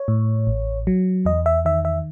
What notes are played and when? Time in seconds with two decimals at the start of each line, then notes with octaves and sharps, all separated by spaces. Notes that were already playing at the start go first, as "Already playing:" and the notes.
Already playing: C#5
0.08 A2
0.47 A1
0.87 F#3
1.25 E2 D#5
1.46 E5
1.65 D#3 E5
1.85 E5